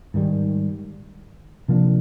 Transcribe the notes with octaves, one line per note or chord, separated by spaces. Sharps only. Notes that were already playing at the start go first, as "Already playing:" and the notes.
G#2 D#3 G3
C3 F3 A#3 D4